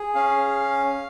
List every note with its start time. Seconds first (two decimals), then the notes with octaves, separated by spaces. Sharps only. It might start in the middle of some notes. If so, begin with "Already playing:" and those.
Already playing: G#4
0.15 C#4 F5